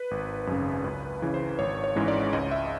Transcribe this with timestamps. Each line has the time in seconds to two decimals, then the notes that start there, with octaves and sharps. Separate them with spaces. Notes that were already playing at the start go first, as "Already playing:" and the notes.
Already playing: B4
0.11 G#1
0.47 F#2 C#3
0.84 C#2 B4
1.22 C#3 E3
1.34 C5
1.59 G#1 C#5
1.84 C#5
1.96 G#2 E3 G#3 C#4
2.08 D5
2.33 C#2 D#5
2.51 E5